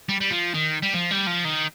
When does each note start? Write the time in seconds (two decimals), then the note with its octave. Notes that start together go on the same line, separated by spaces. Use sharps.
0.09 G3
0.21 G3
0.31 F3
0.54 D#3
0.82 G3
0.94 F3
1.11 G3
1.26 F3
1.44 D#3